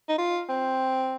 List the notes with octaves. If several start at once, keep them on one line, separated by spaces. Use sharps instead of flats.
D#4
F4
C4